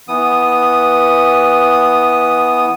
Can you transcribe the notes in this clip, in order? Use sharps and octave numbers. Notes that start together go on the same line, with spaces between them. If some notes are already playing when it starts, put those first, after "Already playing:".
E3 B3 D#6